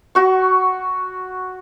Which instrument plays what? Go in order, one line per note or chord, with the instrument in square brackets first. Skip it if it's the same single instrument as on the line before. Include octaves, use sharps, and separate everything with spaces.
[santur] F#4 C#6